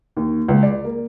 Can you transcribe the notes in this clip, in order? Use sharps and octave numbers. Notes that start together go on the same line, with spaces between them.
D#2
C#2
D5
A#3